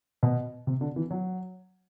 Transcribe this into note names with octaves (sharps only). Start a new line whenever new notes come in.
B2
C3
D3
E3
F#3